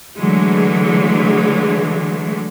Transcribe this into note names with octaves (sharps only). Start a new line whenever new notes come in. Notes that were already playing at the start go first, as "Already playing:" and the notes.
D3 E3 F#3 G#3 A3